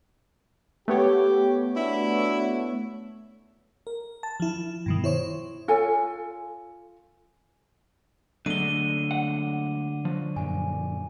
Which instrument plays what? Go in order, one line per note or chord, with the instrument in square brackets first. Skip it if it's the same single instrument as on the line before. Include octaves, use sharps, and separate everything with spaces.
[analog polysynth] A3 B3 C#5 [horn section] G4
[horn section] D4 E4 F#4
[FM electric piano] A#4
A5
F3 E4
G2 B2 D#3
E4 C5 C#5
[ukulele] F4 A4 C#5 G#5
[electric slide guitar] D3 [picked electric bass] F#3 G#3 A3 [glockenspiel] D#7 G7
[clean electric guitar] F#5
F3 F#3
[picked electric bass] F#2 A#2 [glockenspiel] G#5